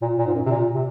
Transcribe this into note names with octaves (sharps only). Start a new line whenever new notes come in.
A#2
A#2
G#2
F#2
C3
A#2
C3